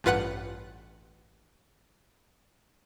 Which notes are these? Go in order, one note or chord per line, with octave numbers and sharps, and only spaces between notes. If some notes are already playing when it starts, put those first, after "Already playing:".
A1 G2 F4 B4 F#5 F#6